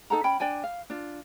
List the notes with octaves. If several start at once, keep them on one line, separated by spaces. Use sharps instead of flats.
D#4 A4 F#5 A#5
C#4 G5 B5
D4 D5 G5 G#5
F5
D4 F4